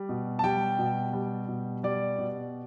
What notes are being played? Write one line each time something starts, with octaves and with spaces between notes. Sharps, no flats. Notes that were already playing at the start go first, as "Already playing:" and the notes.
Already playing: G3
B2
A5
G3 G5
B2
G3
B2
G3 D5
B2